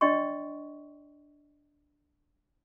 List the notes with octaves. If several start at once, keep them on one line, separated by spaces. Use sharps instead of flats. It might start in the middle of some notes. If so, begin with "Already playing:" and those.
D4 D5 D#5 G5 C6 C#6